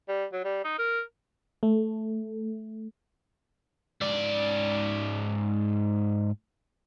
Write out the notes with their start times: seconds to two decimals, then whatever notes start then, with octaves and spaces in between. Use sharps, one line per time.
0.08 G3
0.32 F#3
0.45 G3
0.65 D#4
0.79 A#4
1.63 A3
4.02 G#2 D5